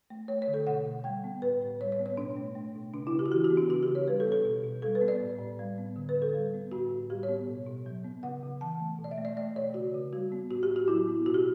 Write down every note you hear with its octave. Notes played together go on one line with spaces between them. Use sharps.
A3
A3 C#5
C#5
D3
A4
B2 F#5
B2
G3 G5
B3
A2 B4
A2
G3 C#5
C#5
B3
C#5
B2 D4
A3
A3
B2
C#3 D4
E4
C#3
G4
F#4
E3 G4
F#4
B3
D4
C#3 F#4
G4
C#3
C#5
G3 B4
A4
B3
A4
B2
B2
G3 A4
B4
B3
D5
A2
A2
G3
B3
D3
B4
D3
A4
G3
B3
A2 F#4
A2
G3 G4
C#5
B3
B2
B2
F#3
B3
C#3 F#5
C#3
E3 A5
A3
B2
D5
E5
A3
D5
A3 D5
B2 C#5
C#3 F#4
C#3
G3 F#4
B3
A2 F#4
G4
A2
F#4
F#3 E4
B3
B2 F#4
G4